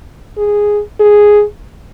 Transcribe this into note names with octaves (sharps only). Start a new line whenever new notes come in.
G#4
G#4